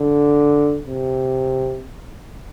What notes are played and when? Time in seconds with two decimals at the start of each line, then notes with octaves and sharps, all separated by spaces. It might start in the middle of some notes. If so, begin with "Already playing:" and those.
Already playing: D3
0.87 C3